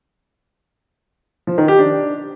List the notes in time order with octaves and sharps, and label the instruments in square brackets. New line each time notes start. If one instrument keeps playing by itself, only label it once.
[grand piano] F3
D#3
G4
D4